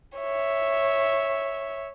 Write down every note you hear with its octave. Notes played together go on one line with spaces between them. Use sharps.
C#5 E5